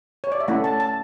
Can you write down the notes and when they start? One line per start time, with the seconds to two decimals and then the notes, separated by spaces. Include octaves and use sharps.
0.24 C#5
0.32 D5
0.40 E5
0.48 A3 C#4 E4 F#5
0.64 A5
0.80 A5